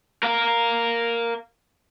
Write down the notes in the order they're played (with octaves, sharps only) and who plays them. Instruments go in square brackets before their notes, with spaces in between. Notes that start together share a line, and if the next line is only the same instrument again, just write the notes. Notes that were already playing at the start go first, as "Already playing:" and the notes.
[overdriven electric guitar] A#4 F5